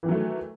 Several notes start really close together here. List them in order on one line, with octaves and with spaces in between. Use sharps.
E3 D#3 F#3 A3